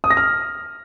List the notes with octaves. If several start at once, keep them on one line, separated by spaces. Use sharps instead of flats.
D#6
A#6
F6